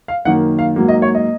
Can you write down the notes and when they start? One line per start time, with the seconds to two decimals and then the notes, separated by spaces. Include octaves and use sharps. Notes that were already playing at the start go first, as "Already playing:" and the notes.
0.08 F5
0.25 F#2 D#3 A#3 F#5
0.59 F5
0.76 G#2 F#3 A#3
0.89 D#5
1.02 C#5
1.15 D#5